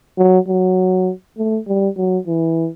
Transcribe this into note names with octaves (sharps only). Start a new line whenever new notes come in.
F#3
F#3
A3
G3
F#3
E3